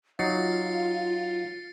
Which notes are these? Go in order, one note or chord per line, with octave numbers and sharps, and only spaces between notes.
F#3 D#4 F4 F5 A6 C7 C#7